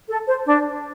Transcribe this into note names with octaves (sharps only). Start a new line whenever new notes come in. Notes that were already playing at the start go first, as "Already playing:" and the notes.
A4
C5
D4